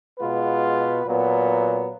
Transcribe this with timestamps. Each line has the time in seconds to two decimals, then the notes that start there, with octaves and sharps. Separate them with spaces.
0.19 B2 G#3 B3 F4 B4
1.05 A#2 F#3 B3